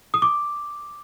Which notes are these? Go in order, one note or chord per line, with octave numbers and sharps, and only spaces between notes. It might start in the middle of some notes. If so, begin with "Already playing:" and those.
D#6
D6